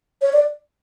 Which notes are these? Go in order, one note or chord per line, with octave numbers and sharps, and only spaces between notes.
C#5
D5